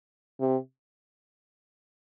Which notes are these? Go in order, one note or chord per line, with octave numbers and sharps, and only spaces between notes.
C3